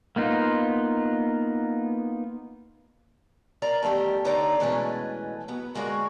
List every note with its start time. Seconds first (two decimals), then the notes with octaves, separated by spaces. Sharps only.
0.16 A#3 B3 D#4 F4
3.62 A#4 D5 A#5
3.83 E2 D#3 A3 G4 A#4
4.25 D3 D#4 C#5 D5 E5 A#5
4.60 B2 E3 G#3 A3 B3 C#4
5.48 F#3 B3
5.75 D3 G#3 A#3 F#4 A#4 C#5